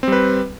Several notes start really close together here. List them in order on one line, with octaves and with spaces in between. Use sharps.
C4 G3 B4